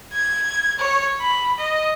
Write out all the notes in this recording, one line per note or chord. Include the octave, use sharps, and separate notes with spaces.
G#6
C#5
B5
D#5